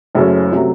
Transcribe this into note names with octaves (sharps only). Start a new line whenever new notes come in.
F#1 F#2 C#3 A3 C#4
C3 F#3 A3